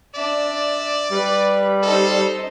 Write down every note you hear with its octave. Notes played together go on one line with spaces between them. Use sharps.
D4 D5 E5
G3 B4
D#4 A4 C5